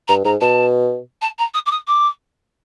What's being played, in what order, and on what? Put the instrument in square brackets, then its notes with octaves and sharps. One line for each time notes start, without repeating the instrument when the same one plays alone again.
[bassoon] G2 [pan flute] A#5
[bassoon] G#2 [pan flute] A#5
[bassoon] B2 [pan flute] A5
[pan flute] A5
A#5
D#6
D6
D#6
D6